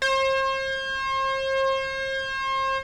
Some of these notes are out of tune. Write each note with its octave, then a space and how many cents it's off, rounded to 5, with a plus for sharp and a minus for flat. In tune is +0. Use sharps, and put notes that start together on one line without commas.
C5 +40